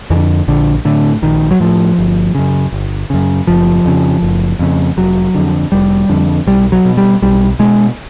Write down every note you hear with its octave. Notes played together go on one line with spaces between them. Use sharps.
F2 D3 E3
A#1 D3
A2 D3
A#1 D#3
F#3
A2 F3
G1
F#2 C#3
G1
F#2 C#3
F#1 F3
F2 C#3
F#1
F2 C#3
F1 F#3
F2 D3
F1 G3
F2 D3
B1 G3
F#3
B2
G3
B1 G3
B2 G#3